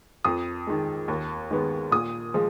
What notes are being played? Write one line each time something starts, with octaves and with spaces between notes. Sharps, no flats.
F2 D#6
D#3 G#3
D#2
D#3 G#3 B3
A#2 D#6
F3 G#3